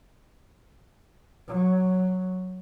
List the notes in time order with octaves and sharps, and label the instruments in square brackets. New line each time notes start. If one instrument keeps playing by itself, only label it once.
[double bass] F#3